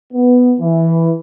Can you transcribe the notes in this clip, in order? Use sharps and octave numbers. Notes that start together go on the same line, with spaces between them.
B3
E3